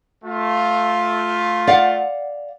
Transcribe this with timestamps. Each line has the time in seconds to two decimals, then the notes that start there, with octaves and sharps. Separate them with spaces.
0.24 A3 F4
1.67 D5 F5 F#5